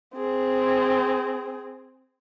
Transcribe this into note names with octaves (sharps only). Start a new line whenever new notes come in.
C4 G#4